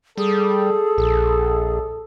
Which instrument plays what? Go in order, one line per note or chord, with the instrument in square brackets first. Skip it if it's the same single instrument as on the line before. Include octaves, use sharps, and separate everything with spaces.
[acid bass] G3 [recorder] G#4 [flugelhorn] A4
[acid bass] A#1